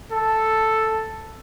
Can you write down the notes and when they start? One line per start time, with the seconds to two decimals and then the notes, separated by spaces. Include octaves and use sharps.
0.12 A4